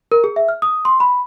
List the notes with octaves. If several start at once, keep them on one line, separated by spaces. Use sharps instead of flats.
A#4
G#4
E5
F6
D#6
C6
B5